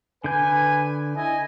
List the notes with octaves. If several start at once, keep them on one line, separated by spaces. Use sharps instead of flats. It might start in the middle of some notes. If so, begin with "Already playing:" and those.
D3 B4 G#5 G6
E4 D#5 G#5